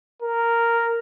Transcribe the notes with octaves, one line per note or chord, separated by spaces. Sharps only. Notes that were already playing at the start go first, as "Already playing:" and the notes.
A#4